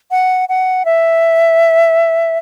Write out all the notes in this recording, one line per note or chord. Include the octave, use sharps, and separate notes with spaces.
F#5
F#5
E5